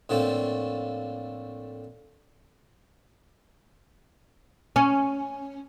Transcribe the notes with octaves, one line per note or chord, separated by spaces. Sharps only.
A2 D3 F3 A3 A#3 C4
C#4